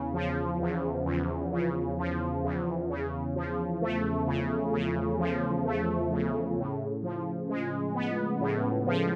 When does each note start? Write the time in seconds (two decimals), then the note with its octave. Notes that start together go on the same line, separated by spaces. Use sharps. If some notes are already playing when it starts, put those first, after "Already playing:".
Already playing: E2 C#3
0.14 F3
0.60 E2
1.06 E2
1.52 C#3
1.98 F3
2.43 E2
2.89 C#3
3.35 F3
3.82 A3
4.27 C#3
4.73 C#3
5.19 F3
5.65 A3
6.11 C#3
6.56 A2
7.03 F3
7.49 G#3
7.95 B3
8.41 A2
8.87 F3